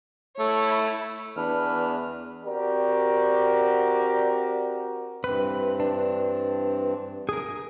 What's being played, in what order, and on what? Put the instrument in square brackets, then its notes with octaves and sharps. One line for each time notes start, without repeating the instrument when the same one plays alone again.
[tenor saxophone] A3 [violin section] E4 C#5
[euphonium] E2 [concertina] D4 B4 F6
[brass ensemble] C4 F#4 G4 A#4 D5
[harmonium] G2 E3 C4 [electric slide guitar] B4
[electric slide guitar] D4
G#4 A#4